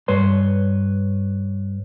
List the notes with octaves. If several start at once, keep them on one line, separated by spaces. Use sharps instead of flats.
G2 B4 C#5 C6